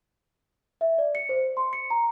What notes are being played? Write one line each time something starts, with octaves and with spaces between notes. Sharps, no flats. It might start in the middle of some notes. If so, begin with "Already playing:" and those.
E5
D5
C#7
C5
C6
C#7
A#5